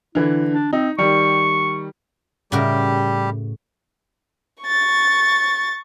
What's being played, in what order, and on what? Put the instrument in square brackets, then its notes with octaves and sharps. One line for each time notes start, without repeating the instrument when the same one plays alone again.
[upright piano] D3 E3 [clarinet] E4
[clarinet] D4
[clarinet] C4 [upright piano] D#4
[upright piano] D#3 G3 [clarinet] C#6
[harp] A2 [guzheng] C#3 F#4 A#4 [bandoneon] G3 G4
[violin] C#6 A6